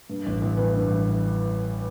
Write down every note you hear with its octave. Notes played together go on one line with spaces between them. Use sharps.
G2
A1
A1
E3
G2
A1